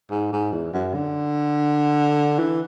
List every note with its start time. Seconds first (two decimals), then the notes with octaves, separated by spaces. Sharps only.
0.11 G#2
0.32 G#2
0.53 E2
0.73 F#2
0.94 D3
2.39 E3